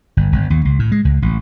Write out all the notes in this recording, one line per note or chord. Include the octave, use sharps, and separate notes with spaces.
G1
G1
D#2
C#2
A2
G#3
C#2
A1